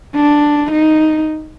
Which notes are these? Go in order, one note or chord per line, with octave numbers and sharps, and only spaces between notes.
D4
D#4